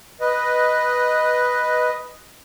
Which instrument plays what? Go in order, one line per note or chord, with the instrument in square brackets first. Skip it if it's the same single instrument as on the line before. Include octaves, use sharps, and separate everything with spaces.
[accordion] B4 D#5